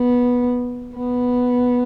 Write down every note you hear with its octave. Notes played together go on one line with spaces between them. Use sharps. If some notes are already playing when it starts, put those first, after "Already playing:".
Already playing: B3
B3